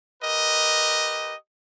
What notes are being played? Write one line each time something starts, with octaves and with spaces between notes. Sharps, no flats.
G4 A#4 B4 D#5